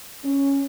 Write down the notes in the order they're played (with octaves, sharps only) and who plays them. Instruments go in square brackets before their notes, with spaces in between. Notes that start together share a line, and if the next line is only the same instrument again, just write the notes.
[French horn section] C#4